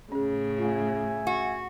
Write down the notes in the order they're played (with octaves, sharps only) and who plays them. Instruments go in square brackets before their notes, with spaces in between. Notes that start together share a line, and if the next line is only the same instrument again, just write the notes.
[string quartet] A2 C#3 [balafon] C#4 G#4
[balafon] A3 F4 [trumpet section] E5 G#5
[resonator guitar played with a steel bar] F#4